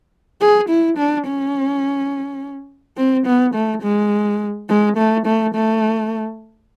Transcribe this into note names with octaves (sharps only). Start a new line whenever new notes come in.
G#4
E4
D4
C#4
C4
B3
A3
G#3
G#3
A3
A3
A3